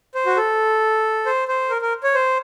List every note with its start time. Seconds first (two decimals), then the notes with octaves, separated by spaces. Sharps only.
0.15 C5
0.26 F#4
0.37 A4
1.26 C5
1.48 C5
1.70 A#4
1.82 A#4
2.03 C#5
2.14 C5